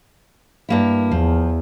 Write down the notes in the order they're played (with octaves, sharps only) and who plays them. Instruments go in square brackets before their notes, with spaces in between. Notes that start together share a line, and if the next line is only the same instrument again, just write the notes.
[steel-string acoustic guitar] G2 A#3 E4
[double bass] E2 [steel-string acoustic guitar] F3